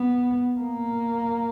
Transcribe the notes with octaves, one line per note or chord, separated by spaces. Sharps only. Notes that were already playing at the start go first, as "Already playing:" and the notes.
Already playing: B3
A#3